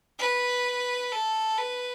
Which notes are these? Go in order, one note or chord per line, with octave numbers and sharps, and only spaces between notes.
B4
A4
B4